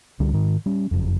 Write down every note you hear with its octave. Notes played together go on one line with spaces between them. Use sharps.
C#2 D3 G3
G#2 D#3
G3 C#4
F#1 F2